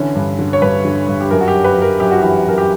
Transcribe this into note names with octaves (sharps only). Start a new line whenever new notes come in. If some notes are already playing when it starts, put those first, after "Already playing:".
Already playing: D3 E3 C#4
G2
D3
C#5
G2 B4
D3
G2
G4
F#2 A#4
F#4
G4
F#2
B4
F#2
A#4
F#2 G4
F#4
E3 G4
F#2 A#4
G4